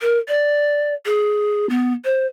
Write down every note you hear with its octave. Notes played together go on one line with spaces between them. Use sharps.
A#4
D5
G#4
B3
C5